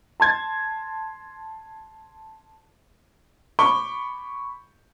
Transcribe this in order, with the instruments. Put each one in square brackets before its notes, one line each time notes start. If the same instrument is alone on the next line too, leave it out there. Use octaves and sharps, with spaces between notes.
[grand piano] A5 C6 G#6 A6
[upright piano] B5 C#6 D6 G7